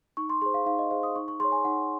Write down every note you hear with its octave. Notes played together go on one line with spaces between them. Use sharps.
D#4 C#6
C6
G#4 C5 C6
F5
D#4 F5
D#5
G#4 C5 F5
D#6
D#4 C#6
C#6
G#4 C#5 C6
G#5
D#4 F#5